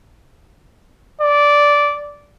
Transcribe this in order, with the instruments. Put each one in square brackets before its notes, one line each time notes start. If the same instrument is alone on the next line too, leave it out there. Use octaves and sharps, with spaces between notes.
[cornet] D5